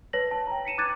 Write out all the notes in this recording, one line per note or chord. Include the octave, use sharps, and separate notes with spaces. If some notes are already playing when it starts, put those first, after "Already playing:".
B4 C#5 A5 A#6 F#7
A5
G5 A#5
B6 C#7 D#7 E7
D6 F#6 G#6 A6 D#7